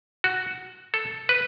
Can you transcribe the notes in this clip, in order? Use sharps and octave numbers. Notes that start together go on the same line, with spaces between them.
F#4
A4
B4